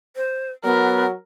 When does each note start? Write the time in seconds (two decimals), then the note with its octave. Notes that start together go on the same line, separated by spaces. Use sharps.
0.16 C5
0.64 F#3 B3 A#4